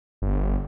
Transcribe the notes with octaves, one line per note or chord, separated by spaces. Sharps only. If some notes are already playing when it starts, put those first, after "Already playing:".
G1